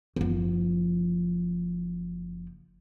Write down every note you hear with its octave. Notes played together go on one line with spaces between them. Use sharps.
F#1 F3